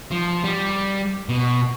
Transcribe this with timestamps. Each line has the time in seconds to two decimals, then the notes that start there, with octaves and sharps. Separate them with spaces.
0.11 F3
0.44 G3
1.29 B2